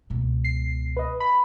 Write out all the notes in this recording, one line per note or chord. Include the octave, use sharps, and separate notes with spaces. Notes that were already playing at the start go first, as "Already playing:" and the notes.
C#2 B2
C7
B4 D#5
B5